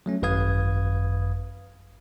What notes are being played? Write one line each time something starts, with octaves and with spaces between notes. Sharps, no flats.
F#3 A3 C#4
G#1 F#2 B4 F5 D#6 G#6